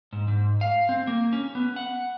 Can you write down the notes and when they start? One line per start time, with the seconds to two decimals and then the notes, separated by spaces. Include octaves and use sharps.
0.13 G#2
0.28 G#2
0.61 F5
0.89 C4
1.07 A#3
1.33 C#4
1.55 B3
1.76 F#5